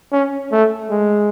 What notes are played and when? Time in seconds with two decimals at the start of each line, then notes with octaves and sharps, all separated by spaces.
0.12 C#4
0.52 A3
0.90 G#3